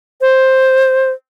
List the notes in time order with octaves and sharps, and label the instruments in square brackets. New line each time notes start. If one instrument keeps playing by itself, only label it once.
[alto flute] C5